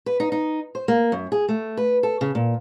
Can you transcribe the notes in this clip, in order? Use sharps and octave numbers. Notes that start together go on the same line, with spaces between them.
B4
D#4
D#4
C5
A#3
F#2
G#4
A3
B4
A4
C#3
A#2